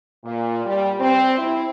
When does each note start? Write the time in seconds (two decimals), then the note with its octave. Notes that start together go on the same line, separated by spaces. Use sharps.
0.24 A#2
0.65 G3
1.00 C4
1.38 E4